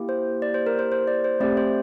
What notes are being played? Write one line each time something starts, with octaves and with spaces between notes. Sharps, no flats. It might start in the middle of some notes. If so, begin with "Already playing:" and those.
Already playing: A#3 E4 G4
C5
D5
C5
A#4
C5
C5
D5
C5
A3 C4 G4 D5
C5